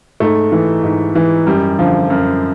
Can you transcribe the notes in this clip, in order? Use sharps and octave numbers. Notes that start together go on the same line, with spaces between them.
G#2 A3
E3
G#2
E3
F#2 G3
D3 F3
F#2